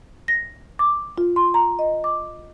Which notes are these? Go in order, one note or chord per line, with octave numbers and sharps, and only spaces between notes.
A#6
D6
F4
C6
A#5
D#5
D6